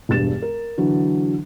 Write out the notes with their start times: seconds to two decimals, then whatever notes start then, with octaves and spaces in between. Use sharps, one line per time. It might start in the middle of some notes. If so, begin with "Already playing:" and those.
0.09 E1 G2 A6 E7
0.42 A#4
0.78 D3 E3 F#3